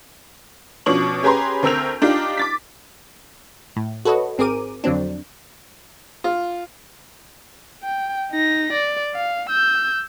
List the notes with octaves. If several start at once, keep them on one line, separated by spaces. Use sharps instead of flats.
B2 F3 C#4 D4 C#6 F#7
C#4 G4 G#4 B4 A#5 C6
D2 C4 A#4 E6 G6 F7
D4 D#4 F4 G4
D6 A6 B6
A2
F#4 A4 B4 C#5 D#5
G#1 C4 G#4 A#4 D6 D#7
F2 D3 F#3 C4 D4
F4
G5
D#4 A#6
D5
F5
E6 G6